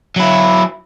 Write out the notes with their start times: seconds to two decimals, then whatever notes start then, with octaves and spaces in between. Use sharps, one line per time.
0.16 F#3 E4